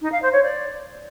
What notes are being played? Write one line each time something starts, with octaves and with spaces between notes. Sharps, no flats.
D#4
F5
C5
C#5
D5